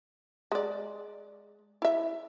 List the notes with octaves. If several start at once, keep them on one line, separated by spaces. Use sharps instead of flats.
G#3 D5
E4 E5